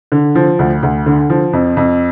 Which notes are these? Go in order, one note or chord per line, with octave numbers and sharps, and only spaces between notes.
D3
F3
D2
D2
D3
F3
F2
F2